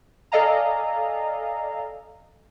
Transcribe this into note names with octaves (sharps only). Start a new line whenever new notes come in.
A4 D5 D#5 F5 G#5 A#5